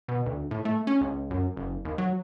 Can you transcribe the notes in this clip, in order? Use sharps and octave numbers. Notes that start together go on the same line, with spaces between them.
B2
D2
A2
A3
C#4
C#2
F#2
F#1
D#2
F#3